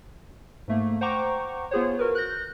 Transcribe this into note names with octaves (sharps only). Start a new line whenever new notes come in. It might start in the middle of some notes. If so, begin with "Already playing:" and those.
G#2 A3 A#3
C5 F#5 G5 A#5 C#6 D6
B3 F4 G#4 C5 C#5
F#4 A#4 B4
F#6 G6 A#6